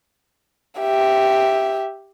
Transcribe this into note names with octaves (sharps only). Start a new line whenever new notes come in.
G4 E5